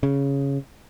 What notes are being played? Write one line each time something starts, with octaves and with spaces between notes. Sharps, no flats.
C#3